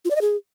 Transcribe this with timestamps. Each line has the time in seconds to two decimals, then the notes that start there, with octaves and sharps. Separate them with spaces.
0.05 F4
0.10 D5
0.16 D#5
0.21 G#4